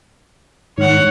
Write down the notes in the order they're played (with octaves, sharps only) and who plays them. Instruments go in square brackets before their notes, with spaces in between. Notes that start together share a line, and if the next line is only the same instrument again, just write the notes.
[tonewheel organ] G#2 D#3 [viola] C#5 F#5